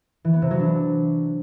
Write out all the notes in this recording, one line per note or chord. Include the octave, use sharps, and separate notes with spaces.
E3
B3
C3
F#3
D4